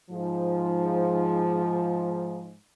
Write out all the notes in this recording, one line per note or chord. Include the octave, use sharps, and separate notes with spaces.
G#2 F3